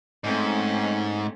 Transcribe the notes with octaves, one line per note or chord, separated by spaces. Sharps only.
G#2 A3 C4 C#4